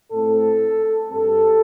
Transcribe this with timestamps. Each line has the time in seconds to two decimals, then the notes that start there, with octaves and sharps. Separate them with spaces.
0.12 A2 A3 C4 A4
1.09 G2 G3 C4 A4